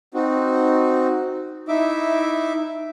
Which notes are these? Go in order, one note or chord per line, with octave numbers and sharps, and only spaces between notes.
C4 D#4 F#4
D#4 E4 E5 D6